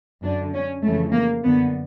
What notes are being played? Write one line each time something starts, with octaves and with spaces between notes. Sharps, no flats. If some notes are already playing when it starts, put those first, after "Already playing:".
F#2 D3 D4
C#4
F2 C#3 E3 A3
A#3
F#2 D3 B3